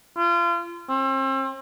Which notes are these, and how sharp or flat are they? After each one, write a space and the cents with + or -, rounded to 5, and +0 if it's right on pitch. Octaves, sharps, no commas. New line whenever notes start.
F4 -30
C4 +40